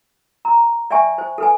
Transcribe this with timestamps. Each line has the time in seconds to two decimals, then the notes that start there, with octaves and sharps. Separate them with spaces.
0.45 A#5
0.91 D5 E5 G5 G#5 C#6
1.18 C5
1.38 A4 B4 G#5